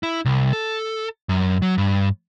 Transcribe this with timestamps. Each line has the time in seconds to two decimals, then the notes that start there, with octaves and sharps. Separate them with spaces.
0.03 E4
0.25 C2
0.53 A4
1.29 F#2
1.62 F#3
1.78 G2